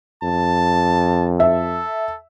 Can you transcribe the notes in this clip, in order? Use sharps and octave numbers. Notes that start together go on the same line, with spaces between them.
F2 A5
A4 E5